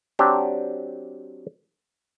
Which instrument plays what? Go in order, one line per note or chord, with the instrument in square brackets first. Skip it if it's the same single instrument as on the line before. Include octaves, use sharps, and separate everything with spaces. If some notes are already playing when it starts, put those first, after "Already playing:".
[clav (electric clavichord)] F#3 C4 D4 G4